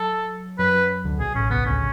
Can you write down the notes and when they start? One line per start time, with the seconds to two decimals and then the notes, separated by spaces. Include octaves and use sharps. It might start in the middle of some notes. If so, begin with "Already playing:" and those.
Already playing: F#3 A4
0.59 F#2 F#3 B4
0.74 F#2 F#3
1.04 D2 D3
1.19 B1 B2 G#4
1.35 A1 A2 C#4
1.50 C#2 C#3 B3
1.65 D2 D3 C#4